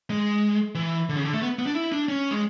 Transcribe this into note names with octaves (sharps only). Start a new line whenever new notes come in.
G#3
E3
D3
C#3
D3
A3
B3
B3
D4
E4
D4
C#4
G#3